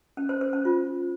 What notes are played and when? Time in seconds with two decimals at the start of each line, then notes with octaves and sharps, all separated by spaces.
0.17 C#4
0.29 C5
0.41 C5
0.53 C#4
0.65 F4